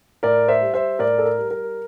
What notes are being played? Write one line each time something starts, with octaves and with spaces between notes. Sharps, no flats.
A2 A#4 D5
C5 E5
G3
C5 E5
A2 A#4 D5
A4
A#4
G3
A#4